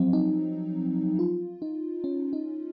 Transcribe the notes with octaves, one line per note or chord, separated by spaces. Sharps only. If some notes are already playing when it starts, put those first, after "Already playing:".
Already playing: F3 F#3 C4
D#4
F4
D#4
C#4
D#4